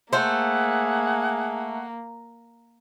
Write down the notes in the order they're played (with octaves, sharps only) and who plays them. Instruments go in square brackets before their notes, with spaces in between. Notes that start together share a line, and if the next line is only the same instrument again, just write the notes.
[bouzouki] A3 C5 [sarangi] A#3 [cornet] G#4 [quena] F#5